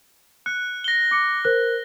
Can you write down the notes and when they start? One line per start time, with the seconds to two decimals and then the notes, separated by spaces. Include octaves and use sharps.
0.46 F#6 C#7
0.84 A#6 G7
1.11 D6 C#7
1.45 A#4 C5 F#6